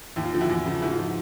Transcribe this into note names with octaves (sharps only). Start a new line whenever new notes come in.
D#2 E4
F4
D3 F3
E4 F#4
E2
C#3 F3
G#2 E4 F#4
F4
F3